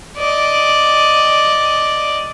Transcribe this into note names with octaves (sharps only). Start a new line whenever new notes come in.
D5 D#5